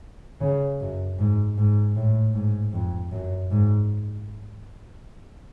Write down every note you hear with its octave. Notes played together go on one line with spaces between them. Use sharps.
C#3
F#2
G#2
G#2
A2
G#2
F2
F#2
G#2